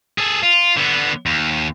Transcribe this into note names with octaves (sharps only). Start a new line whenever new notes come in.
G#4 A4
F4
D3 B3
D#2